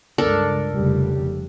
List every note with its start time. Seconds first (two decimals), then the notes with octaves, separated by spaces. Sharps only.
0.18 C#2 G2 D4 A4 A#4
0.72 F1 C#3 G3